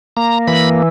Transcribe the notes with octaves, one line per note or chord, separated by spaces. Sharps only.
A#3 A#5
E3 B5